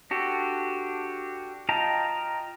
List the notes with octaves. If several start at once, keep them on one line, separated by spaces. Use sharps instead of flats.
D4 F#4 G4 A4
F4 D#5 G5 A5 A#5